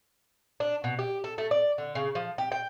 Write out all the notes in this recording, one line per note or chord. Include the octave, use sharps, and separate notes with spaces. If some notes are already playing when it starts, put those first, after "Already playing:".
D4
B2
G4
A4
A3
D5
D3
C#3
F3
G4
G5